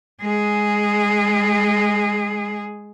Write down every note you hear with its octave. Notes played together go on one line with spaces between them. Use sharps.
G#3 G#4